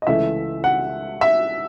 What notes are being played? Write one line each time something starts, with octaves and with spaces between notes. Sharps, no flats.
D#5
C#2 C#3 E3 A3 E5
F#5
E5